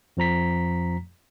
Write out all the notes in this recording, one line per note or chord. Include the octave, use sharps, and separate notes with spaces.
F2 F3 A#5 B6